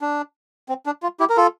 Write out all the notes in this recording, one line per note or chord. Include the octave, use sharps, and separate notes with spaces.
D4
C4
D4
F4
E4 G4
A#4
F4 A4